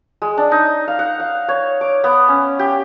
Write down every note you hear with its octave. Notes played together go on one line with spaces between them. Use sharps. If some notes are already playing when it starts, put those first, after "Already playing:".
G#3
D4
D#4
F5
F#5
F5
C#5
D6
B3
C#4
G4